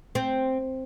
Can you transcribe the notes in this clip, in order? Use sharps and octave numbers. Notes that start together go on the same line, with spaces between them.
C4